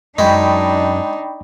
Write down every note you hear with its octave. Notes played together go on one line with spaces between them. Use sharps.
F#2 G#3 D4 D#4 G5 B5 C#6